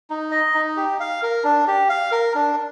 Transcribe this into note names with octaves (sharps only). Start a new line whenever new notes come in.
D#4
D#5
D#4
G4
F5
A#4
D4
G4
F5
A#4
D4